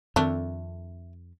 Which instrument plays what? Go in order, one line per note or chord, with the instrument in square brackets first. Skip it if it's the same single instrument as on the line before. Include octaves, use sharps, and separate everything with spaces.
[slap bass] F2 [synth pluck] D#3 C4 [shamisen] A3 D4